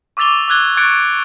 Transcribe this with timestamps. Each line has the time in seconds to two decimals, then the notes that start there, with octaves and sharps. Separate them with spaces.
0.17 C#6 D6 E6 A6 F7 G7
0.48 D6 E6 F#6 G#6 G7
0.77 C#6 F#6 G#6 A6 C#7 D7